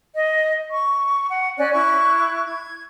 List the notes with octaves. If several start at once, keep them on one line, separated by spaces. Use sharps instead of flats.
D#5
C#6
F#5
C#4 C#5 D5 F#6
E4 C#6 F#6
G#6